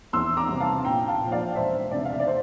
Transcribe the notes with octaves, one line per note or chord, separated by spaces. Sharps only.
E2 C6 E6
A#5 D6
C3 G3
F5 A5
A#1 G5 A#5
F5 A5
A#2 F3
D5 F5
E1 C5 E5
D2 C3 D5
F5
E5
D5
C5